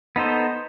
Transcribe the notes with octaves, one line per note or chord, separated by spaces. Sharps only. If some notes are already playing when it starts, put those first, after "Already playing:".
B3 D#4 A4 C5